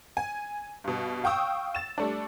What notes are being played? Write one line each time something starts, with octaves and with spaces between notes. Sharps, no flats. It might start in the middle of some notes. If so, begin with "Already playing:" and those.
G#5
G2 B2
F5 G5 C#6 D#6 E6
A6 E7
G3 A3 D4